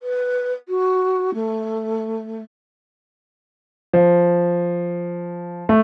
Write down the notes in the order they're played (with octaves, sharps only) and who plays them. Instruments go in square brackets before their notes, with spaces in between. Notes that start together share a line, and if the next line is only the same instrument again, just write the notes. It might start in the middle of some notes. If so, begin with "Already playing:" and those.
[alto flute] B4
F#4
A3
[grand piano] F3
A3